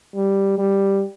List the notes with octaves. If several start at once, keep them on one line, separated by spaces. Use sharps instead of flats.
G3
G3